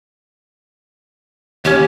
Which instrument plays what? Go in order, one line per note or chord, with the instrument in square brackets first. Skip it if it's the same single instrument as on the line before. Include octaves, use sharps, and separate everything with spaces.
[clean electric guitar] D#2 C#4 [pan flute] G4